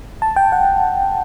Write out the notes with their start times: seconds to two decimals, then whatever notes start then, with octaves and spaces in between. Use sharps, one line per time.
0.22 A5
0.36 G5
0.52 F#5